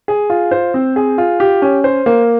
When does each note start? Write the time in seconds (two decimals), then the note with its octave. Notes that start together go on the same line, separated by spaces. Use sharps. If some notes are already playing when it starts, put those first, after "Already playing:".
0.08 G#4
0.30 F4
0.51 C5
0.74 C4
0.96 G#4
1.18 F4
1.40 G4
1.62 C#4
1.84 C5
2.06 A#3